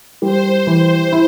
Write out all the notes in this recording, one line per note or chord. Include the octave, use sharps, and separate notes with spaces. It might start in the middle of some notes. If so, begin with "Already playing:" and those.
G3 C5
E3
E4